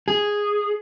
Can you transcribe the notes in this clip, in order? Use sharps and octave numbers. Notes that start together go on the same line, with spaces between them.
G#4